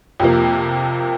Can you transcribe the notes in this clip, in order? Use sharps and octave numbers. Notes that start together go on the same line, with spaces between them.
F2 C3 F3 A#3